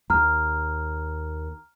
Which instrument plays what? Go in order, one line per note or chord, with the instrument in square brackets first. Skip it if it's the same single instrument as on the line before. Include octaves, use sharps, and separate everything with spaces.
[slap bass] D#2 [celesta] A#5 F6